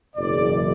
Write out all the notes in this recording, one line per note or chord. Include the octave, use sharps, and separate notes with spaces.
F#1 E2 B2 D5